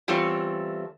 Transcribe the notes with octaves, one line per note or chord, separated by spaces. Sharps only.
E2 G3 A3 C4 F4 C#5